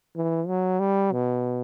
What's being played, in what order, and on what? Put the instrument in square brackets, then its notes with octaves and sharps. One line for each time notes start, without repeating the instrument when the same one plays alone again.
[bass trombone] E3
F#3
G3
B2